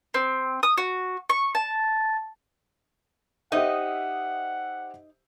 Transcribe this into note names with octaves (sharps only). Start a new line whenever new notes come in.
C4
D#6
F#4
C#6
A5
D#4 G4 C5 D#5 E5 F#5